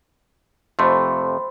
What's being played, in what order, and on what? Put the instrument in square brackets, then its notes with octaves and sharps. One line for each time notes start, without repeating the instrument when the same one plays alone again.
[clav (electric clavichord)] F2 C3 A3 [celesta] C5 B5 C6